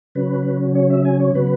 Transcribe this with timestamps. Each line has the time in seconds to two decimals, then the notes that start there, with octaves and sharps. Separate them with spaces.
0.15 C#3 F#3 C#4 B4
0.75 C#5
0.90 E5
1.05 G#5
1.20 C#5
1.34 C#3 F#3 B3 B4